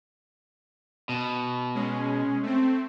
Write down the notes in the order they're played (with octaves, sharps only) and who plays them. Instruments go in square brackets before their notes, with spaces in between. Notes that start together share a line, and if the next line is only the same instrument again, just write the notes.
[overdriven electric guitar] B2
[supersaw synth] G#3 C#4
A3 C4